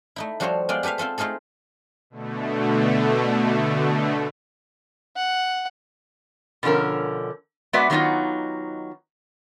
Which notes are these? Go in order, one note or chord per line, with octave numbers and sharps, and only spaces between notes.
A3 D#4 E4
F3 G3 F#4 A4 C5 C#5
G#3 B3 F4 D5 G5
G4 A4 B4 E5 F5
C4 F4 A4 C5
A3 D#4 F4 G#4 A4
B2 D3 A3
F#5
B2 D3 F3 C#4 A#4
G#3 B3 F#4 B4 D5 E5
D#3 F#3 B3 C#4 D#4 F4